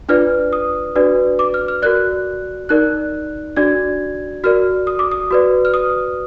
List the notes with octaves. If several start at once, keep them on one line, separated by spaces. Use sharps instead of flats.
D4 F4 B4 D5 F6
D#6
D4 F#4 B4 D5
D6
F6
F6
F#4 A#4 D5 F#6
D#4 A#4 D5 F#6
D4 F#4 D5 G#6
F#4 A#4 D5 F6
D#6
D6
D#6
F#4 B4 D5
F6
D#6